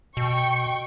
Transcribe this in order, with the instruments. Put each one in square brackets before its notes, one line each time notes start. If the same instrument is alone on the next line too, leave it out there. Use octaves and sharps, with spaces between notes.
[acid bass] B2 [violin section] G5 C#6